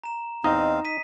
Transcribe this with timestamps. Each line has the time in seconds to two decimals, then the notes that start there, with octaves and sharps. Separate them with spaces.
0.04 A#5 E7
0.44 E2 C4 D#4 D#5 F5
0.85 B6 D#7